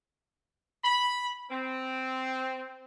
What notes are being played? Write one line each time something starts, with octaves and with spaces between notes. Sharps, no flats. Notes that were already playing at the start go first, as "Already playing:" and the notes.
B5
C4